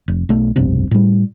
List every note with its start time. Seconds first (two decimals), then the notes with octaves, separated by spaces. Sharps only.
0.08 F1
0.29 B1 A3
0.56 F1 B1 G2 C3
0.91 A2 G3